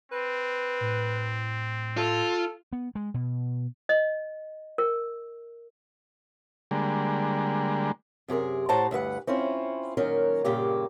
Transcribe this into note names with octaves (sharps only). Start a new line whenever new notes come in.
C4 B4
A2
F4 A4
B3
G#3
B2
D#5
A#4
D3 G3 G#3 A#3
F#2 C3 G#4 A#4
A2 F#4 C5 C#5 A5 A#5
D2 G2 B4 F#5
C4 C#4 E4 F4
A#2 D#3 F#3 C#4 A#4
G2 A#2 C#3 A#3 G4